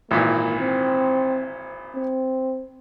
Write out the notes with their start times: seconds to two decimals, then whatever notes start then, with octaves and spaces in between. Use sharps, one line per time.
0.11 G#1 A#2 E3 A#3
0.59 C4
1.95 C4